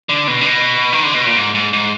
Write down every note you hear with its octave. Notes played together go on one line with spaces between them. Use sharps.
D3
B2
D3
B2
D#3
D3
B2
A#2
G#2
G#2
G#2